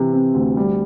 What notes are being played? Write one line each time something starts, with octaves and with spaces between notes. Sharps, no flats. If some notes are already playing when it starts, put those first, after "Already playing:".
Already playing: C3 E3
C4
D2
G3